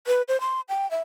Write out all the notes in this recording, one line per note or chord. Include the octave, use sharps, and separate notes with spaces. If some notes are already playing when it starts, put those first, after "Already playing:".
B4
C5
C6
G5
E5